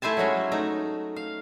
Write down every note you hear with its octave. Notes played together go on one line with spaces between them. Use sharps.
A3 E4 C5 G#5 A5
F#3 G#3 C#4 F#4
A3 D#4
F5